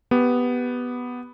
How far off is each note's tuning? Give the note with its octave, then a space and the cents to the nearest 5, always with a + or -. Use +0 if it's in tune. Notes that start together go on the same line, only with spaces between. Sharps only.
B3 +0 G4 +0